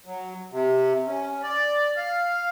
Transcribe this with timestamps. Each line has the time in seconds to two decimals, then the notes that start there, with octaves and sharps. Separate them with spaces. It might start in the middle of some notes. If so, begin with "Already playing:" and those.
0.06 F#3
0.52 C3
1.06 C#4
1.43 D5
1.96 F5